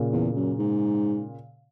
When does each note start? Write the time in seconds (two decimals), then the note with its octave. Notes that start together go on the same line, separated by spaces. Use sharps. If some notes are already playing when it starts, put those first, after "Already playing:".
Already playing: A#2 C#3
0.13 E2
0.36 F#2
0.59 G#2